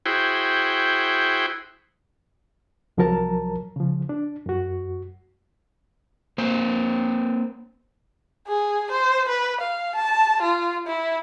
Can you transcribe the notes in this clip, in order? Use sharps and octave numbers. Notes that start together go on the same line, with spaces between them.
E4 F#4 G#4 C5 G5
C2 F3 F#3 A#4 A5 A#5
C#3 F3
D4
F#2 F#4
A#3 C4 C5
G#4
C5
B4
F5
A5
F4
E4